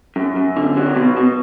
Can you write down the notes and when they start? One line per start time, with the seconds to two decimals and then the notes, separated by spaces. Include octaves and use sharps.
0.16 F#2
0.36 F#2
0.57 D3
0.76 F#3
0.96 B2
1.17 B2